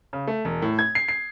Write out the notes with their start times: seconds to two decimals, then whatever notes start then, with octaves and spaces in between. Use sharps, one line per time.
0.13 C#3
0.27 A3
0.45 E1
0.62 A2
0.79 G#6
0.95 C7
1.08 C7